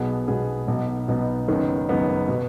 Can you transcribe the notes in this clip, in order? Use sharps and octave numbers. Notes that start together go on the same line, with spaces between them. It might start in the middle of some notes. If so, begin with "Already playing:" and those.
Already playing: B1 B2 B3 G#4
B1 B2 B3 G#4
B1 B2 B3 D#4
B1 B2 B3 D#4
F#1 F#2 D#3 B3 D#4
F#1 F#2 D#3 B3 D#4
B2 B3 F#4